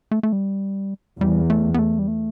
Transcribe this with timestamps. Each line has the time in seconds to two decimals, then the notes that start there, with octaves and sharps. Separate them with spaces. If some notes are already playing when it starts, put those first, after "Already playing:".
0.11 A3
0.23 A3
0.32 G3
1.20 E2 G3
1.50 A3
1.74 B3
1.79 A3
1.99 G3
2.08 A3